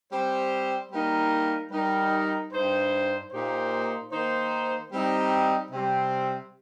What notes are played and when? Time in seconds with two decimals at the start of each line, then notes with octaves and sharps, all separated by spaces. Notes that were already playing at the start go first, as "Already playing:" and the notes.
0.11 G3 C4 G4 C5
0.91 G3 A#3 D#4 A#4
1.71 G3 D#4 A#4
2.52 G2 G3 D#4 C5
3.31 A#2 A#3 D#4 G4 C5
4.12 D#3 A#3 D#4 C5
4.92 G3 C4 D#4
5.72 C3 G3 C4